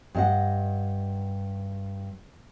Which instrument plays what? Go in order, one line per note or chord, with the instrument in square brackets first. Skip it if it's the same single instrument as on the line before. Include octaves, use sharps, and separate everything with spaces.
[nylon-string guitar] G2 D#5 F#5